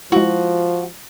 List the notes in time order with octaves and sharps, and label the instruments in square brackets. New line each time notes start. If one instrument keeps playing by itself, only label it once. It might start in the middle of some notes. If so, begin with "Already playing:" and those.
[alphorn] F3 [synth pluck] G#3 E4 [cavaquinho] F#4